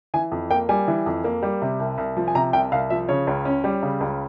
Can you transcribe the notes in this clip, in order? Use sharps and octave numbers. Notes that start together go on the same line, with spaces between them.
E3 G#5
F2
A#3 G5
G3 G#5
E3
F2
A#3
G3
C3
C2
C2
F3
G#5
C3 A#5
C2 G5
C2 F5
F3 E5
C#3 C#5
C#2
C#4
G3
C#3
C#2